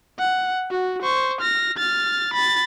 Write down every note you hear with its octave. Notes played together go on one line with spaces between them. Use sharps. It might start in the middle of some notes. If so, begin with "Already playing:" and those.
F#5
F#4
C5 C#6
F6 A#6
F6 A6
B5 A6